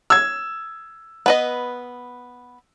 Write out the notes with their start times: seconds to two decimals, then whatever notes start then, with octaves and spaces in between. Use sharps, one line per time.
0.10 E6 G#6
1.26 B3 B4 D#5